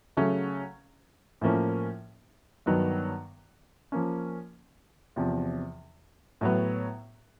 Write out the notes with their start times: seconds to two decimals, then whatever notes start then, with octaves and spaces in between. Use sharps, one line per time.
0.17 C#3 F#3 A3 C#4
1.41 A2 F3 A#3 C#4
2.66 G2 D#3 F#3 B3
3.92 F3 A#3 C#4
5.16 E2 C3 F3
6.41 A2 F#3 B3